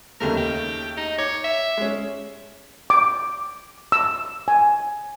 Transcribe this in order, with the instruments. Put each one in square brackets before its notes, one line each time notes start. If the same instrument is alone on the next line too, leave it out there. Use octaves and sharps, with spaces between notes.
[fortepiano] D#2 C#3 A3 [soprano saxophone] A#4
[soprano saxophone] G4
D#4
[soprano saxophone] C#5 [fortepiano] D6
[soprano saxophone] E5
[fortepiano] G#3 C#4
[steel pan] D6
E6
G#5